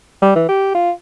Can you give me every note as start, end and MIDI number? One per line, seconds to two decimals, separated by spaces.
0.22 0.31 55
0.36 0.45 52
0.49 0.72 67
0.75 0.91 65